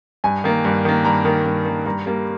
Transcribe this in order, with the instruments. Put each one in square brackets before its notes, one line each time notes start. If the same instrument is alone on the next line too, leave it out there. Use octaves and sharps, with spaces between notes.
[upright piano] G2 G#5
D#3 A#3
G2
D#3 A#3
G2 A#5
D#3 A#3
G2
D#3 A#3
G2 A#5
G3 A#3